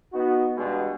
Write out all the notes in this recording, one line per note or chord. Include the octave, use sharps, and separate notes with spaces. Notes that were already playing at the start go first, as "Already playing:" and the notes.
B3 D#4 F#4
E2 G2 B2 G3 G#3